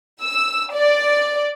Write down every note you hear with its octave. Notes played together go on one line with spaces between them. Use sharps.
E6
D5